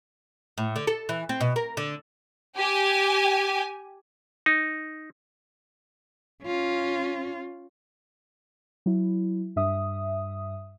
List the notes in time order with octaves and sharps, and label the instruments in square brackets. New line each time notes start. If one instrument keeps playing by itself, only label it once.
[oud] A2
D3
A4
E3
C4
B2
A#4
D3
[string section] G4 G#5
[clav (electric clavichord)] D#4
[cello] C#4 F4
[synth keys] F#3 E4
G2 E5 D#6